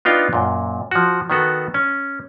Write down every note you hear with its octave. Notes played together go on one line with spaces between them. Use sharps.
B3 D4 D#4 F4 F5 G5
F#2 A#2
F3 F#4
D#3 B3 F#4 A4
C#4